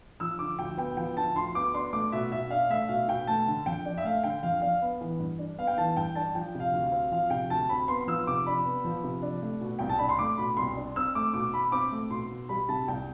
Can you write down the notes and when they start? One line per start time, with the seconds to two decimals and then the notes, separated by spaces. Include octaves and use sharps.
0.20 F3 E6
0.39 D3 D6
0.58 D2 G5
0.77 B3 G5
0.97 F3 G5
1.16 D3 A5
1.35 D2 C6
1.55 B3 D6
1.74 D4 C6
1.93 A3 D6
2.12 B2 E5
2.31 B2 E5
2.50 D4 F5
2.70 A3 E5
2.89 B2 F5
3.08 B2 G5
3.27 A3 A5
3.47 D3
3.66 F2 G5
3.85 D4
3.98 E5
4.04 A3 F5
4.24 D3 G5
4.43 F2 F5
4.61 D4 F5
4.82 B3
5.01 E3
5.19 G2
5.39 D4
5.58 B3 F5
5.67 G5
5.77 E3 A5
5.96 G2 G5
6.15 D4 A5
6.35 F3 G5
6.55 C3
6.60 F5
6.73 D2
6.86 F5
6.92 C4
7.11 F3 F5
7.30 C3 G5
7.50 D2 A5
7.69 C4 B5
7.88 B3 C6
8.07 F3 E6
8.27 C3 D6
8.46 D4 B5
8.65 B3
8.84 F3
9.04 C3
9.22 D4
9.42 A3
9.61 B2
9.79 C2 G5
9.89 A5
9.98 D4 B5
10.09 C6
10.19 A3 D6
10.38 B2 B5
10.57 C2 C6
10.76 D4
10.96 C4 E6
11.15 A3 D6
11.34 B2 D6
11.53 B2 B5
11.72 C4 D6
11.92 A3
12.10 B2 C6
12.31 B2
12.49 G3 B5
12.69 C3 A5
12.88 C2 G5